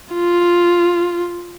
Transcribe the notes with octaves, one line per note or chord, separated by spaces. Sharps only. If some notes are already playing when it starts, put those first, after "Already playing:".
F4